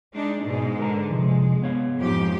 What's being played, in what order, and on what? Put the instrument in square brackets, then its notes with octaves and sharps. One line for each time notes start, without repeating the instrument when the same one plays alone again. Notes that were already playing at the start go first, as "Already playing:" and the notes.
[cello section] G#3 D4 D#4
G#2 B2 G#3
[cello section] D3 [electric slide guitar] A#4 B4 A#5
[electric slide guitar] C3 F3 [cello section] G#3
[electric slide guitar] B3 C#5 F5
[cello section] F2 G#2 G4